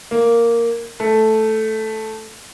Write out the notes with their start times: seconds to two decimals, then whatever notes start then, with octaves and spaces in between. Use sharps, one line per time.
0.11 A#3
1.00 A3